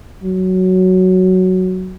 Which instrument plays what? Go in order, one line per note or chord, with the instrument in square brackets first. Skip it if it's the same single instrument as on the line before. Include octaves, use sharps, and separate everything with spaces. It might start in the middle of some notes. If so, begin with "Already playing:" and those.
[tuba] F#3